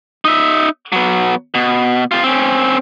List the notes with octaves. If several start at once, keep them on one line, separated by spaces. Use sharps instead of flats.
D#4 E5
F#3 B3
B2
C3 F4
C4 C#4